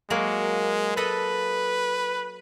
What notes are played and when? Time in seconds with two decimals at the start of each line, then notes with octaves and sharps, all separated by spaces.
0.10 F#3 G#3 A#3 C#5
0.97 A4 B4 D#5 B5